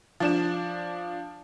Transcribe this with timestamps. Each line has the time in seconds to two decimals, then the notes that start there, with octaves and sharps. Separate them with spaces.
0.20 F3 D4 E7